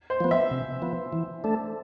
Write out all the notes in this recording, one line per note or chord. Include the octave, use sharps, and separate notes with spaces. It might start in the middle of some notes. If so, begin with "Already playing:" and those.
C5
F3 B3
E5
C3
F3 B3
E3
A3 D4 A4